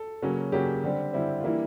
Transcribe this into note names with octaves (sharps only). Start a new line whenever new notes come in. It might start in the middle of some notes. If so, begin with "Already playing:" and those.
Already playing: A4
C#3 F#3 A#3 C#4
C#3 F#3 A#3 C#4 G4
D3 G3 C4
D3 G3 C4 E4
F4
E3 G3 A#3 D4 E4